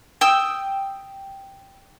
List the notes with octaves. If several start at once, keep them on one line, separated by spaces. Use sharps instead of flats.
G5 D#6 E6